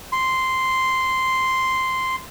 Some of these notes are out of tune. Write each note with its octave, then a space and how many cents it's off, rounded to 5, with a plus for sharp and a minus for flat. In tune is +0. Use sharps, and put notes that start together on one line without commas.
C6 -5